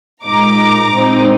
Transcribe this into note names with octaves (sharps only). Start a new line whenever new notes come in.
A#2 G#3 D#4 A#5 D6
A#2 G#3 C4 D#4